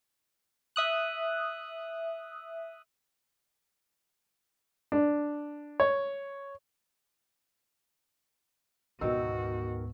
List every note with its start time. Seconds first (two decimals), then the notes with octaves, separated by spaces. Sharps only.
0.76 E5 D#6 F#6
4.92 D4
5.80 C#5
9.01 D2 G#2 B2 D#3 F#4 A#4 E6